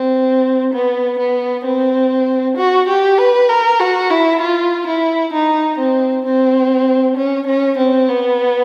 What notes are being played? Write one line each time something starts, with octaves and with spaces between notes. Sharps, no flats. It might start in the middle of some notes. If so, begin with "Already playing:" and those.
Already playing: C4
B3
B3
C4
F#4
G4
B4
A#4
F#4
E4
F4
E4
D#4
C4
C4
C#4
C#4
C4
B3